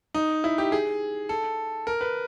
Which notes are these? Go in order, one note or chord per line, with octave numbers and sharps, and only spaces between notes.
D#4
E4
G4
G#4
A4
A#4
B4